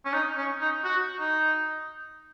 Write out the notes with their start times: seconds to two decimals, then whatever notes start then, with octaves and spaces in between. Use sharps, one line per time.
0.05 C#4
0.13 D#4
0.37 C#4
0.61 D#4
0.84 F#4
1.19 D#4